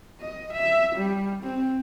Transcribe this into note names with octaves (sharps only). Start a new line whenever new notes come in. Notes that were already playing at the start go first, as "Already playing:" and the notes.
D#5
E5
G3
C4